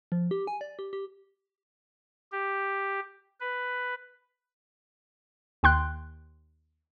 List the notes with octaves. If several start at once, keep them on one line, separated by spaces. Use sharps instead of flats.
F3
G4
G#5
D5
G4
G4
G4
B4
D#2 G5 C6 F#6